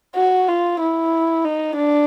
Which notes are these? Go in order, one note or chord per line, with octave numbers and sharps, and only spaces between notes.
F#4
F4
E4
D#4
D4